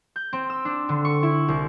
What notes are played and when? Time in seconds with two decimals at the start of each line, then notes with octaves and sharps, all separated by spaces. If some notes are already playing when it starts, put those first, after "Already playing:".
0.16 G6
0.33 C4
0.50 E6
0.65 D4
0.89 D3
1.05 C#6
1.23 E4
1.48 C2